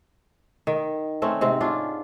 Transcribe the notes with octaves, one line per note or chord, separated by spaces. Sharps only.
D#3
A3 C4 C#4
G#2 C3 C4
C#4 D4 F4